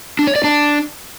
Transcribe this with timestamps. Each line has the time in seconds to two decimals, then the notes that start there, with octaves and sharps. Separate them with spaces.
0.19 D4
0.27 C#5
0.36 D5
0.44 D4